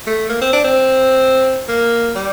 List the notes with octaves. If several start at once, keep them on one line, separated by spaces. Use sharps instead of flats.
A3
A#3
C4
D4
C4
A#3
G3